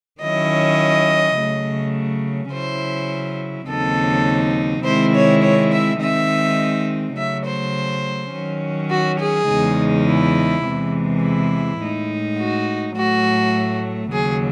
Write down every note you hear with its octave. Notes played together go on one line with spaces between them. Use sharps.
D#3 F#3 C#4 E4 D#5
C#3 F#3 A3
C#3 F#3 C#4 E4 C5
D#2 C#3 F#3 C4 D#4 A4
C3 D#3 G#3 C4 E4 C5
C#5
C#5
E5
D#3 G#3 C4 D#4 E5
C#3 F#3 A3 E5
C5
D#3 F#3 C#4
F#4
G#4
E2 C#3 G#3 D#4
E4
E2 C3 E3 G#3
E4
A2 G#3 D#4
F#4
A2 F#3 A3 F#4
D#2 C#3 F#3 G#4